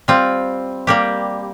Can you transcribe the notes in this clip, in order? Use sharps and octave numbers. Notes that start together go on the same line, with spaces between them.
G3 C4 F4
G3 A#3 G4